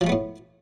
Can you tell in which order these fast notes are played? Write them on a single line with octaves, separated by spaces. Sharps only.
F3 G#3 A3 B3 A2